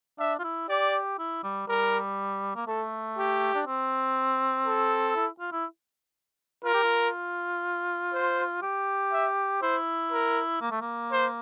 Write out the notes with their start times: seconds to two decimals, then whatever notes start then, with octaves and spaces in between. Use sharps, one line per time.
0.19 D4 E5
0.39 F4
0.44 E4
0.69 G4 D5
1.18 E4
1.44 G3
1.67 G3 A#4
2.55 A#3
2.67 A3 A4
3.17 G4
3.55 D4
3.67 C4
4.66 A4
5.16 E4
5.40 F4
5.52 E4
6.64 F4 A#4
6.74 G4
6.84 F4
8.13 C5
8.62 G4
9.12 E5
9.62 E4 C5
10.12 A#4
10.61 A#3
10.71 A3
10.81 A#3
11.12 C5